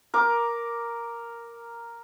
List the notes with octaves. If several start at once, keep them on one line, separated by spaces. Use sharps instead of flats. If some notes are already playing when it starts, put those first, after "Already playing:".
A#4 D6